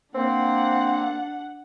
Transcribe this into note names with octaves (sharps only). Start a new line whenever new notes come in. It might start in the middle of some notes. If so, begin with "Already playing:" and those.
A#3 C4 D4 F#5